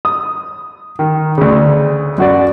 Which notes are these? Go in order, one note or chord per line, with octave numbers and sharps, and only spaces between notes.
D#6
D#3
D2 C#3
F#2 F#4 D5